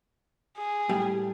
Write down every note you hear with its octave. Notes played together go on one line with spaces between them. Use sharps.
G#4
A2 G3